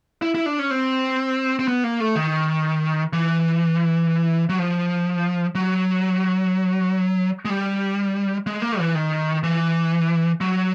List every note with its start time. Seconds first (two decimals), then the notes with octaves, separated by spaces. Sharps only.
0.22 E4
0.35 E4
0.46 D4
0.59 C#4
0.70 C4
1.59 C4
1.68 B3
1.84 A#3
2.00 A3
2.16 D#3
3.13 E3
4.49 F#3
4.59 F3
5.55 F#3
7.45 G#3
7.49 G3
8.47 G#3
8.62 A#3
8.79 E3
8.95 D#3
9.43 E3
10.41 F#3